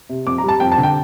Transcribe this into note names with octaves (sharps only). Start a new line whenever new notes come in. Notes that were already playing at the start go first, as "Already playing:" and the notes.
C3
F2 D6
A#5
G3
A5
F2 G5
A5
D3
G5